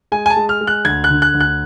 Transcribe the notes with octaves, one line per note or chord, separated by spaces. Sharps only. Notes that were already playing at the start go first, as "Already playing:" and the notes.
G#3 G#5
G#5
A5
G#3
F6
G#3
F#6
D2 G#6
F#6
D3
F#6
D2
F#6